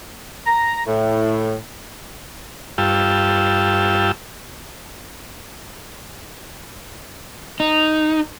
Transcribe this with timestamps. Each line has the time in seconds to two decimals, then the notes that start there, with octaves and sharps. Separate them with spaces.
0.45 A#5
0.85 A2
2.78 G2 F4 G5 A5 E6
7.60 D#4